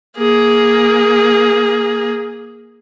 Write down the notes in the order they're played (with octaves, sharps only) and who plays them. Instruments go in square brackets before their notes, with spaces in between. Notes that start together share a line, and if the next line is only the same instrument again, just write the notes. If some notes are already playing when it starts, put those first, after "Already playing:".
[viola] A#3 G#4